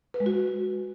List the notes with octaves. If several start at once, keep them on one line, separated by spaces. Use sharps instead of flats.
B4
G#3
F#4